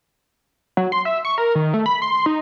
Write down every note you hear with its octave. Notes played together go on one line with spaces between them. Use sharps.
F#3
C6
E5
C#6
A#4
D#3
A3
B5
C6
D#4